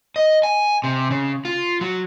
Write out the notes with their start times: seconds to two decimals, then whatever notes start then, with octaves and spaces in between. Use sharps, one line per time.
0.16 D#5
0.43 G#5
0.84 C3
1.11 C#3
1.45 F4
1.81 F#3